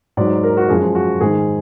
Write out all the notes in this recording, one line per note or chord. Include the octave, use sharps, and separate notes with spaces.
G#2 F#3 D5
A#4
F#4
F#2 F3 G#3 G#4
F#4
G#2 D#3 G#3 G#4